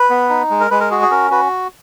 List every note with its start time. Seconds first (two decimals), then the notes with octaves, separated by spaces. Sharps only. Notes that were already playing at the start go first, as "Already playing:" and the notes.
Already playing: B4
0.10 B3
0.29 D#4
0.50 G#3
0.60 A#4
0.70 G#3 B4
0.80 A#4
0.91 F#4 G#4
1.02 G#4
1.10 C#4 A#4
1.31 F#4 B4